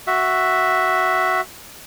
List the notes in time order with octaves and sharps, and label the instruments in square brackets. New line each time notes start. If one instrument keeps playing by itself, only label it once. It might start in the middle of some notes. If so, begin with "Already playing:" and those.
[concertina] F#4 E5